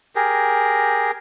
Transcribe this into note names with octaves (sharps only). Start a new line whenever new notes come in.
G4 G#4 A#4